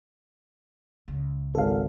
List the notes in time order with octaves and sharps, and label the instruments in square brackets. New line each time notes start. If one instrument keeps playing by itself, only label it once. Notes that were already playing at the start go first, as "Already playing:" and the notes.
[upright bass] C#2
[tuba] G#1 [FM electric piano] A4 F5